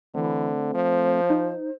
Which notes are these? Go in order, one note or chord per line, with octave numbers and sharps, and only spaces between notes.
D3 E3 A3 C4
F3 C5
D#4